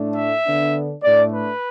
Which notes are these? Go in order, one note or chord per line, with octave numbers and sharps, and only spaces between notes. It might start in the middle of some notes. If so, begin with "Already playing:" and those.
Already playing: A2 A3 D4
E5
D3 B3 D4
A2 A3 D4 D5
B4